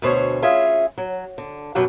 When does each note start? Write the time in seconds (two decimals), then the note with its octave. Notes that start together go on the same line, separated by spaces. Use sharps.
0.02 D2 B2 C5 C#5 G#5
0.42 C#4 F4 G#4 E5
0.98 F#3
1.38 D3
1.75 F#2 B2 F#3 G3 F#5